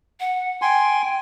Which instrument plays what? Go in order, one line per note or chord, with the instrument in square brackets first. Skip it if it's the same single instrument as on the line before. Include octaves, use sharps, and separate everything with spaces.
[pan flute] F#5
[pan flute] G5 [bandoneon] G#5 C6